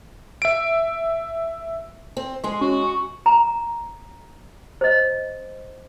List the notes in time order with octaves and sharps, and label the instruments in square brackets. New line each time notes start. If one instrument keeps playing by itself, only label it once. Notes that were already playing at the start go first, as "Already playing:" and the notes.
[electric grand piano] E5 D7
[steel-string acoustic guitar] C4
[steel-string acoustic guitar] G#3 G#4 [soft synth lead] C6
[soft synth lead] C#4 [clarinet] F#4
[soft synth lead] C#6
[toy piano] A#5
C5 D#5